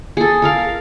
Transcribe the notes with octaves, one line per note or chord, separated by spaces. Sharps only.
G#4 A4
A4 A#4 F5